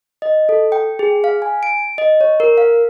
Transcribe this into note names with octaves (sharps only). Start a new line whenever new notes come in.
D#5
A4
G5
G#4
F5
G#5
D7
D#5
C#5
A#4
F5